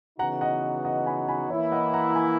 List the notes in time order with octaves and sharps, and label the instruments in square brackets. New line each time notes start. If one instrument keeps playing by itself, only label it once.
[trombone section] C#3 E3 B3 D#4 F#4 [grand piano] F#5 A#5
[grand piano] D#5 F#5
D#5 F#5
G#5 B5
G#5 B5
[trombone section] E3 A#3 E4 [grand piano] C#5 E5
[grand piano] D#5 F#5
F#5 A#5
A#5
G#5 B5